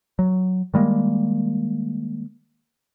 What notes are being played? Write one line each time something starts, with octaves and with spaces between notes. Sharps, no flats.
F#3
D#3 G3 G#3 A#3